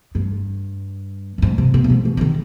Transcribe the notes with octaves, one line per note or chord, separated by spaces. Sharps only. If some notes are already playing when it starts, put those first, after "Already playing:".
G2
G2
G#2
C3
B2
G2
G#2
B2
F3
D#3